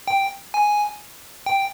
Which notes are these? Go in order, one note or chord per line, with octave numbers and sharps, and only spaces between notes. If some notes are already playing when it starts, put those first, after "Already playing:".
G5
G#5
G5